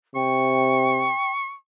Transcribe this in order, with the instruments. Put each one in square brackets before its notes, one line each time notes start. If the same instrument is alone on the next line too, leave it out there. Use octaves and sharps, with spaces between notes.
[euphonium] C3 [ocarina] G5 [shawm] C#6